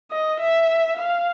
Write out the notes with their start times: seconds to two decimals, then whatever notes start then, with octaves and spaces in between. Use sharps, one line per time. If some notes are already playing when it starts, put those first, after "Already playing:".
0.11 D#5
0.40 E5
0.96 F5